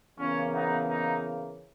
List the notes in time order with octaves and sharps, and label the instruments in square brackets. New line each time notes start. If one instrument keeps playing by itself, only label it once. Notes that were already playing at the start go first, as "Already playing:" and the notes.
[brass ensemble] E2 C#3 E3 A#3 C#4
B3 D#4
B3 D#4